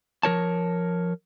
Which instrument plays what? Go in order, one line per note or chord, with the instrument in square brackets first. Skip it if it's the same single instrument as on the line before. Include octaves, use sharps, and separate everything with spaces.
[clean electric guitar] F3 A#4 C#5 A5